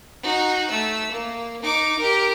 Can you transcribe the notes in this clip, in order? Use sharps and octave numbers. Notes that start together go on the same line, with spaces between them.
D#4 F#4
A3 E6
A#3
D#4 D6
G4 A#4